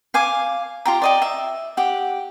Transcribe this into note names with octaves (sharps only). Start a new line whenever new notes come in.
F5 G#5 D6
F4 G4 A#5
D5 D#5 G5
E5
G4 F#5